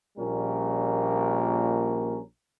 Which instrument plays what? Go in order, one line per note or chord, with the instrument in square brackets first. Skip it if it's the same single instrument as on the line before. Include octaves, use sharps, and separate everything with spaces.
[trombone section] A#1 A#2 G3 C#4 A#4